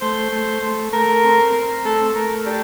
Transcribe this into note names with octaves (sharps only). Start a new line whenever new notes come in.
A3 C5
A3
A3
A3 A#4
C4
C4
A3 A4
A3 A#4
D4 G4